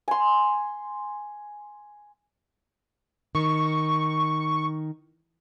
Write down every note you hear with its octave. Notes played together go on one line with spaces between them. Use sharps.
G#5 C6
D#3 C#6